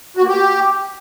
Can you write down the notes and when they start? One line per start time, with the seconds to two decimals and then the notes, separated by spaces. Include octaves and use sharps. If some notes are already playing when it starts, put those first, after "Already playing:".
0.17 F#4
0.23 A#3
0.28 G4